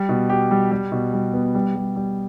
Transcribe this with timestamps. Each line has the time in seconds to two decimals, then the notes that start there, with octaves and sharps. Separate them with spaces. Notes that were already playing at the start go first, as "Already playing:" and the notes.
Already playing: G3
0.09 B2
0.30 G4
0.51 G3
0.71 G3
0.92 B2
1.14 G3
1.34 B3
1.55 G3
1.75 G3
1.96 G3